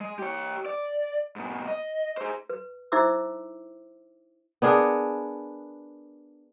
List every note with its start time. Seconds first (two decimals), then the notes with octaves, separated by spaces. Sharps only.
0.01 G#3
0.19 G4 C#5
0.66 D5
1.36 G#2 B2
1.68 D#5
2.17 G#4 C5
2.50 B4
2.92 D#4 E4 C5 E5 D6 E6
4.62 B3 D4 G#4 A#4